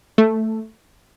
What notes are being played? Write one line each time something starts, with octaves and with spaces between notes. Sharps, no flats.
A3